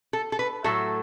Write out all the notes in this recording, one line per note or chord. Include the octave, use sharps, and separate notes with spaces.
A4
A4
B4
A2 F#3 A3 A4